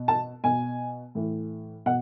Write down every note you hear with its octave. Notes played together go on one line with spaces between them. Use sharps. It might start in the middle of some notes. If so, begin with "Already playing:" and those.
Already playing: B2
A5
B2 G#5
A2 E3
B2 F#5